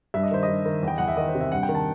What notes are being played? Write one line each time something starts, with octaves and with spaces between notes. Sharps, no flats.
G2 E5
D#5
D#3 C5
D#5
G2
D#3
E2 G5
E2 F#5
E5
D#3 D#5
C5
C3
E5
G2 F#5
G5
D#3
A5